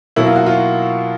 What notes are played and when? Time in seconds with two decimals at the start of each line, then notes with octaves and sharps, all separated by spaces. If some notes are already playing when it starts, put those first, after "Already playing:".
0.16 B2 F#3 A#3 E4
0.26 F4
0.36 F#4
0.46 F4